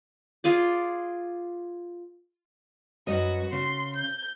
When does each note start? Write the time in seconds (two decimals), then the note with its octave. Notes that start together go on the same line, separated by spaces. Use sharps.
0.44 F4 G#4 D5
3.07 F#2 F#4 B4 D#5
3.52 C#3 C6
3.96 G6